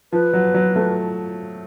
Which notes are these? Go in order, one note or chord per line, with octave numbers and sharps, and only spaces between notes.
F3 B4
F#3
F#3
A3